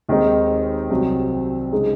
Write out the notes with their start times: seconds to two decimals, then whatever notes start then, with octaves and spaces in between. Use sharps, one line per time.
0.09 D#2 D#3 G#3 C4 D#4
0.90 C2 C3 F#3 C4
1.72 C#3 G#3 D#4